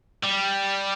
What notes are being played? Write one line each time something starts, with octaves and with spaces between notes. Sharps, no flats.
G3